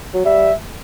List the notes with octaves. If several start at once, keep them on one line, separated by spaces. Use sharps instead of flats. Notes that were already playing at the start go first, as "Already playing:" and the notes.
F#3
G3 E5